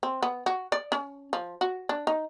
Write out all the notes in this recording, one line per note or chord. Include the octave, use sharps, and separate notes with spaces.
C4
B3
F#4
D5
C#4
F3
F#4
D4
D#4